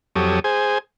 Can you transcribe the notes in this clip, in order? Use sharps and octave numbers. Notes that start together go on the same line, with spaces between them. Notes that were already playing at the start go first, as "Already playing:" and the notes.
F2 F#3 G4 A4 C#5 D#6
G#4 C5 G#5